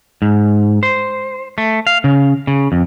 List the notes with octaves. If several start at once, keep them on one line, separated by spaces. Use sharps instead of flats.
G#2
C5
A3
F5
C#3
C#3
F2